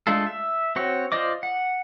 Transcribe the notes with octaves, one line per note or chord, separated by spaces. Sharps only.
G#3 A3 D4 F4 A4
E5
C4 F#4 C#5
F4 C5 D5 D#5 D6
F#5